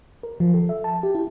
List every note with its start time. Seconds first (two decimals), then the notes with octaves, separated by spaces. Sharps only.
0.23 A#4
0.40 F3
0.54 A4
0.69 E5
0.84 A5
1.03 G4
1.15 E4